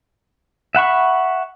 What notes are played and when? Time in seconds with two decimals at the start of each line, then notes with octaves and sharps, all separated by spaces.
0.75 E5 F#5 B5 C#6